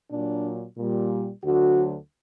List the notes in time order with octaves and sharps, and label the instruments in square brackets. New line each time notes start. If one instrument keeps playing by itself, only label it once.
[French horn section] A#2 F#3 D4
A#2 G3
D2 D3 F#3 F#4